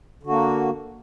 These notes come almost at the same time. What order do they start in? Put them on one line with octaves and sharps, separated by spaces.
D3 F#4 A#3